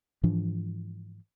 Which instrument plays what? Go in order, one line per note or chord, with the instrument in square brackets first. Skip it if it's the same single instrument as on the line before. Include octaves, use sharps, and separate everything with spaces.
[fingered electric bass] G#2 E3 F3 D4